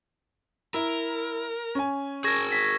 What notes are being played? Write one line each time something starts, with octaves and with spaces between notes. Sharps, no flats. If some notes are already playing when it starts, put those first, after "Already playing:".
E4 A#4
C#4 G#5
G#4 A#4 C#6 G#6 A#6
B6